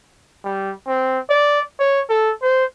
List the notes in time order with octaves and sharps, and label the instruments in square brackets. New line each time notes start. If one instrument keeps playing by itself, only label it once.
[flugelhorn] G3
C4
D5
C#5
A4
C5